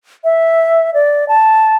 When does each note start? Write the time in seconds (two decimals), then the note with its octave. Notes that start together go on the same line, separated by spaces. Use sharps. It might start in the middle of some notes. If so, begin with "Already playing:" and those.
0.24 E5
0.94 D5
1.28 A5